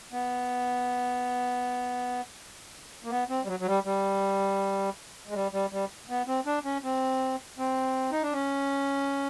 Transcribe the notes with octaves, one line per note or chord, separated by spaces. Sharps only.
B3
A#3
B3
C4
G3
F#3
F#3
G3
G3
G#3
G3
G3
G3
B3
C4
D4
C#4
C4
C4
D#4
D4
C#4